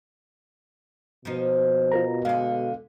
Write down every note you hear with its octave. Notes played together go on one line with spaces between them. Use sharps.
B2 F3 A#3 D#4
F4 A#4 A#5
D3 G#3 F5